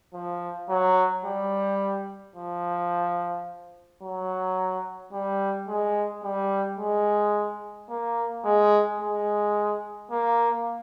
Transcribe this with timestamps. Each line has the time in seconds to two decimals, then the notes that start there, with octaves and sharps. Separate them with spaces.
0.14 F3
0.70 F#3
1.25 G3
2.36 F3
4.02 F#3
5.13 G3
5.68 G#3
6.23 G3
6.79 G#3
7.89 A#3
8.44 G#3
9.00 G#3
10.11 A#3